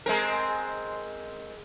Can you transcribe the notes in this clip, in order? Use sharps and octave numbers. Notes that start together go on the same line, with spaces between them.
G#3 C4 A#4